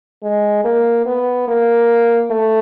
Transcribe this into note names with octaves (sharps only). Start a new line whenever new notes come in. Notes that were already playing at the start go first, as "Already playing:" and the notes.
G#3
A#3
B3
A#3
A3